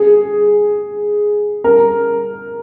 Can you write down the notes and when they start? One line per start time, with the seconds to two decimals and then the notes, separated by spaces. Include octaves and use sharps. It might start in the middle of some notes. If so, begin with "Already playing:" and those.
Already playing: G#4
1.64 A#4